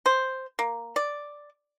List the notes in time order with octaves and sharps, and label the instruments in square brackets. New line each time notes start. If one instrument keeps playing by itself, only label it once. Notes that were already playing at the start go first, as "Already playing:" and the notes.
[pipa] C5
A#3
D5